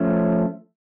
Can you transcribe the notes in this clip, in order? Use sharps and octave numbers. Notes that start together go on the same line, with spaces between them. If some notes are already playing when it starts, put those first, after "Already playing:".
Already playing: F3 A3 C#4